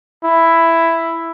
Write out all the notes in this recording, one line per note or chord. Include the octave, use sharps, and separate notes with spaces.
E4